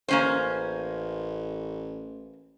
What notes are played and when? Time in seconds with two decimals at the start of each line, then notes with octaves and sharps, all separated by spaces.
0.08 A1 A#3 C#4 C5